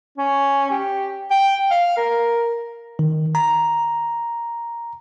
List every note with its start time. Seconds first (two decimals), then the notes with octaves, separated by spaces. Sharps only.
0.18 C#4
0.71 G4
1.30 G5
1.71 F5
1.97 A#4
2.99 D#3
3.35 A#5